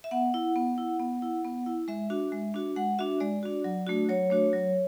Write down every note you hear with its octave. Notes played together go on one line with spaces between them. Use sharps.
E5
B3 F#5
E4
B3
E4
B3
E4
B3
E4
G#3 E5
D4 F#4
G#3
D4 F#4
G#3 F#5
D4 F#4 E5
G#3 D5
D4 F#4
F#3
A3 D4 F#4
F#3 C#5
A3 D4 F#4
F#3